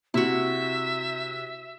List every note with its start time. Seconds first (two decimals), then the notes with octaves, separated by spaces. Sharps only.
0.14 C3 E4 F#4 E5